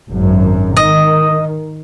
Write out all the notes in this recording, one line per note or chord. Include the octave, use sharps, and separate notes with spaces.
G#1 F#2
D#3 D#5